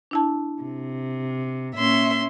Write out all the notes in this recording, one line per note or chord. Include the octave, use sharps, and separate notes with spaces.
D4 E4 A5
C3
A#2 C#4 E5 C6